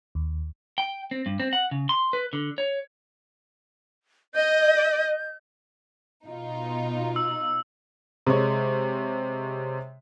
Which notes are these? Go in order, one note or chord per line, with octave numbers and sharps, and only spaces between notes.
D#2
G5
C4
G2
C4
F#5
C#3
C6
B4
D3
C#5
D#5 G6
B2 D#4 F4
E6
C3 G#3 C#5